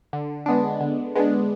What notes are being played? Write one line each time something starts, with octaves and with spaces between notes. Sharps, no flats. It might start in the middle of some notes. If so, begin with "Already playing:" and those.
D3
G#3 B3 D4
D3
G#3 B3 D4